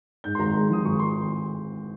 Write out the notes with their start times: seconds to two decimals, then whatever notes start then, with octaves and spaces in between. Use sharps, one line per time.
0.24 G#2 G6
0.35 C6
0.39 G#1 A#5
0.54 G#3 C6
0.70 F3 D#6
0.85 G#1 C#6
0.99 C6